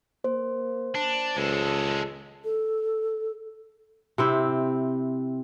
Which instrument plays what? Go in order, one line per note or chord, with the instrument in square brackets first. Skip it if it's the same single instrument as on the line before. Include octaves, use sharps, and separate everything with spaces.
[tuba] A#3 [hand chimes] C5
[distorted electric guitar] D4
[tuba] C#2 [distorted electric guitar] G#3 A4
[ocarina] A4
[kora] C3 C4 E4